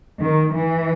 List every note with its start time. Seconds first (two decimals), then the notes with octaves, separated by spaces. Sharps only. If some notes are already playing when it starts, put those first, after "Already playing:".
0.19 D#3
0.54 E3